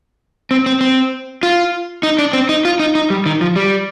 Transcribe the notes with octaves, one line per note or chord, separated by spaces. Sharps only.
C4
C4
C4
F4
D#4
D4
C4
D#4
F4
D#4
D#4
G3
D#3
F3
G3